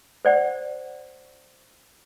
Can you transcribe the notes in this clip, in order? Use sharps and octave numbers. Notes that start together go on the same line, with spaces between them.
C5 D5 F#5